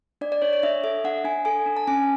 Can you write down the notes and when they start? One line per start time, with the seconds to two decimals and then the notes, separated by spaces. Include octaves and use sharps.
0.21 D4 D5
0.32 D5
0.42 D4 C#5
0.53 C#5
0.63 D4 E5
0.84 A4 E5
1.04 D4 F#5
1.24 D4 G#5
1.45 A4 G#5
1.66 D4
1.77 A5
1.87 C#4 G#5